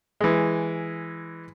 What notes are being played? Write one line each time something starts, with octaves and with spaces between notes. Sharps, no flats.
E3 G#3